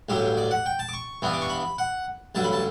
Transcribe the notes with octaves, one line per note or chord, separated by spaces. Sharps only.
A1 G2 F#3 G4
D5
F#5
G5
A5
D6
C#6
G2 E3 B3 D4
D6
C#6
B5
F#5
A1 G2 F#3 A5
B5
A5